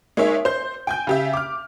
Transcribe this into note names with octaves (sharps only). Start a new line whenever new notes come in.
G#3 A#3 D#4 C#5 E5
C5 G6
G5 G#5 G6
C#3 G4 E5
D6 F6